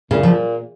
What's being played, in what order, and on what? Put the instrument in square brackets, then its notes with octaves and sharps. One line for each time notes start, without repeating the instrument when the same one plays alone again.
[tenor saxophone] A#2 [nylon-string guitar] C#3
[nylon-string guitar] F3